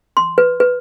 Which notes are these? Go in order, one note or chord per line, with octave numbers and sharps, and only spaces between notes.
C6
B4
B4